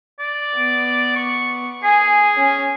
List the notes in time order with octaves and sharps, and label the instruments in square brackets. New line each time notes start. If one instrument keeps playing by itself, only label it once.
[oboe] D5
[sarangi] B3
[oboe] C#6
[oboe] G#4 [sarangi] G#5
[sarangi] C#4